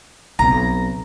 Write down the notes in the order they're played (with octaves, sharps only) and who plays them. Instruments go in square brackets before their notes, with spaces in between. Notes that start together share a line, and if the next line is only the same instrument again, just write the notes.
[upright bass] B1 C4 [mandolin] A#5